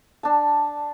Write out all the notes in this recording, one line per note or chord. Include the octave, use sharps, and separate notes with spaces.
D4 A5